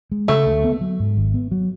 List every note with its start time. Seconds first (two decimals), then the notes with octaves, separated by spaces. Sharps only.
0.12 G#3
0.28 C#3 A3
0.46 D2
0.64 B3
0.81 F#3
1.00 G#2
1.17 G#1
1.34 B3
1.52 F#3